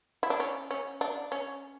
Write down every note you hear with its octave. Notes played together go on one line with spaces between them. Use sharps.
E4
D4
C#4
C#4
D4
C#4